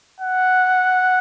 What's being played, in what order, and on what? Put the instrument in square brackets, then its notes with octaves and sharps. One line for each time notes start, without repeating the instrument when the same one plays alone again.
[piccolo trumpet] F#5